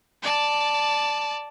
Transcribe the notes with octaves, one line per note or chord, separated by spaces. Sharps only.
D5 A5